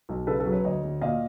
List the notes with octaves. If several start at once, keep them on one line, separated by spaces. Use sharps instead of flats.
B1
C#3 A4 B4
A4 B4
F#3
B4 C#5
D2 C#5 D#5
D2
A#2 D#5 F5